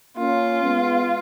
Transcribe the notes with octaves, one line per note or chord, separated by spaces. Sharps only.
A#3 C#4 F4
G#3 B3